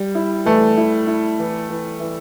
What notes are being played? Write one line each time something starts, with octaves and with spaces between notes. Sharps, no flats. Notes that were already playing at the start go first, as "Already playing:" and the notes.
Already playing: G3
E4
E3 A3
E4
E4
E3
E3
E3